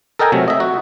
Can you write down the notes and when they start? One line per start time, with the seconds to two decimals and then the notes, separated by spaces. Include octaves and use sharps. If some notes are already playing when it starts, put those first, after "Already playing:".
0.19 A4 A#4 D#5 G5 G#5 A#5
0.32 C3 F#3 A3
0.48 D#5 E5
0.60 F#4